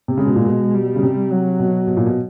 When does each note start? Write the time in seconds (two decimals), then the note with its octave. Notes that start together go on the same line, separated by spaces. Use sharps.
0.08 C3
0.17 C#3 G#3
0.26 B2
0.36 A#2
0.45 B2
0.74 G3
0.96 C#3
1.03 C3
1.31 F#3
1.59 B2
1.87 B2
1.97 A#2
2.06 B2